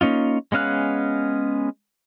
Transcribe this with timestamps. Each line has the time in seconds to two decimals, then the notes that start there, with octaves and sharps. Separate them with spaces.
0.01 A#3 C#4 D#4 F4
0.52 G#3 B3 C#4 F5 F#6